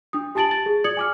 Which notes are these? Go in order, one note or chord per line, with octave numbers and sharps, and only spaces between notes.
D4 D#6
G4 G#5 A5 A6 D7 F#7
A6
G#4
D5 D#6 G#6 C#7 F#7
G#5 D6 F6